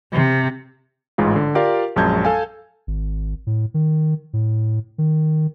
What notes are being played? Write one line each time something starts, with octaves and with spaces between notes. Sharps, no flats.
C3
A1 G#2 G#3 F4
D3
F4 G4 A#4 D5 F5
A#1 F#2 G#3 A5 G6 G#6
A4 F5 G#5
G#1
A2
D#3
A2
D#3